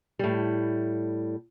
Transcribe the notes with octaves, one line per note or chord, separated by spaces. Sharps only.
A2 G3